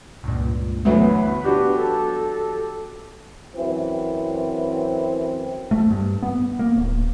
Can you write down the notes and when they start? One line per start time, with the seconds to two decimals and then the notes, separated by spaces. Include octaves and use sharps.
0.24 C#2 G2 A#2
0.85 D2 E3 F#3 B3 B4
1.44 D4 F#4 G4
1.77 A4
3.55 F#2 E3 C4
5.71 A3
5.90 G2
6.22 B3
6.59 A#3
6.76 D1